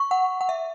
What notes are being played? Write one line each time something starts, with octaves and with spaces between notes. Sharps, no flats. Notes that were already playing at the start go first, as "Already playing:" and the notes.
Already playing: C#6
F#5
F#5
E5